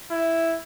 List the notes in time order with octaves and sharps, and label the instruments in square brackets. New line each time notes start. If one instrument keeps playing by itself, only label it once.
[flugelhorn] E4